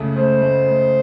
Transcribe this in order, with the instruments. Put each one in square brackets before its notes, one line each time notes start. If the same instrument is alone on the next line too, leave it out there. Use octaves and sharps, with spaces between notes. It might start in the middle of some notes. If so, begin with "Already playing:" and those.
Already playing: [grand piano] C#2 C#3 A3
[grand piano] A3 [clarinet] C5
[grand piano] A3
A3